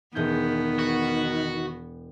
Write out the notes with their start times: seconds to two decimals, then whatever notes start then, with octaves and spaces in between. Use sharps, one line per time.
0.15 E1 D#3 B3 G#4 G6
0.79 F#4